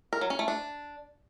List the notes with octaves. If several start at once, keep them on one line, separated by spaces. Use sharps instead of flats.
A#4
F#3
C#4
A3
D4